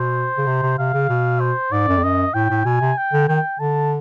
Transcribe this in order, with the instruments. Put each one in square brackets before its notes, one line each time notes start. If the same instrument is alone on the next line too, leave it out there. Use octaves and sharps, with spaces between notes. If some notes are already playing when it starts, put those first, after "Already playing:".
Already playing: [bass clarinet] B2 [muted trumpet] C5
[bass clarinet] C#3
C3
C3
[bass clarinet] C3 [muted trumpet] F5
[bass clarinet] C#3
B2
[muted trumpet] C5
[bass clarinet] G#2 [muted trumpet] D5
[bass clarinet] F#2
F2
[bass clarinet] F#2 [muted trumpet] D#5
[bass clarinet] A2 [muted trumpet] G5
[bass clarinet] A2
[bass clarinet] B2 [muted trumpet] G#5
[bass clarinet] C3
[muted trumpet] G5
[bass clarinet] D3
[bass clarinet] D#3 [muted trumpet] G5
[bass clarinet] D3 [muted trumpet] A5